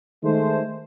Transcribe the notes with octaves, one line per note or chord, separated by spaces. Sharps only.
D#3 G#3 A3 C5